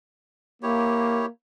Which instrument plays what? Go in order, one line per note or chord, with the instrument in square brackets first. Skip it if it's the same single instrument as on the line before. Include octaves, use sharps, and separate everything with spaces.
[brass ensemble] A#3 [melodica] E4 G4 C#5